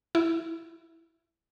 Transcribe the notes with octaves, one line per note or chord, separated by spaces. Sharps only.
E4